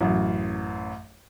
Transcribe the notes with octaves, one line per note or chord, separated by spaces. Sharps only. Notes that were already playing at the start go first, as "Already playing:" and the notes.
A1 F#2